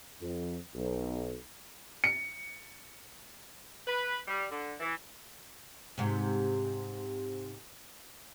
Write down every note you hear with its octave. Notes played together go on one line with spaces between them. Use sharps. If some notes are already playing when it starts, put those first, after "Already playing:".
F2
B1
C#7
B4
G3
D3
E3
G#2 C3